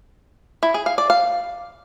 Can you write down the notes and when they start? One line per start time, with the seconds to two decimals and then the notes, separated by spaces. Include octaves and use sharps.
0.63 E4
0.74 G#4
0.86 F5
0.98 D5
1.10 F5